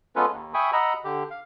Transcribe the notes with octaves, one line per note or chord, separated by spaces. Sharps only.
G#3 B3 C#4 F4 A4 B4
D#2
E5 G5 G#5 B5 C#6 D#6
D#5 F#5 A#5 B5 E6
D3 G4
F5